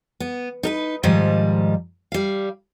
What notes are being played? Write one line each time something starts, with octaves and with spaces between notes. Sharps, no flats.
B3
D#4 A#4 B4
G#2 D#3 F3 G3 D#5
G3 F5